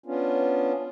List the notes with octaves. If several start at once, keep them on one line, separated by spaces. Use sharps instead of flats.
B3 C#4 D4 F4